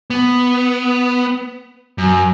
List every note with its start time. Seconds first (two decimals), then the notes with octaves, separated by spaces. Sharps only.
0.10 B3
1.98 F#2